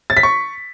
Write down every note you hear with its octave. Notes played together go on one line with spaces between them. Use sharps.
A6
B6
C#6